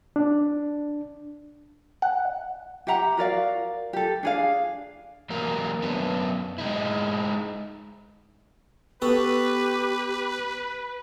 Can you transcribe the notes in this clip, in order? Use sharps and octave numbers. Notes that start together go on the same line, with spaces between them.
D4
F#5
G4 E5 F#5 A#5
F#4 A#4 D5 F5
G4 A4
D4 G#4 F5
E3 F#3 G3 A#3 A#4
F#2 B3 C#4 D4
G#3 D#4 E4
B3 F#4 G4 A4 B4